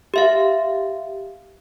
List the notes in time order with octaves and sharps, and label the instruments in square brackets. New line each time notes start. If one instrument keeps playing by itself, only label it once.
[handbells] G4 E5 F5